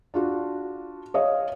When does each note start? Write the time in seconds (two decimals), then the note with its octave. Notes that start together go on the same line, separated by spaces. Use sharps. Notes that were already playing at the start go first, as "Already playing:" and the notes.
0.14 D4 F4 F#4
1.14 C#5 D#5 F5